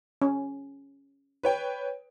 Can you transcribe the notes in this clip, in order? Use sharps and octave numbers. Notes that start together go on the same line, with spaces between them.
C#4
B4 C#5 G5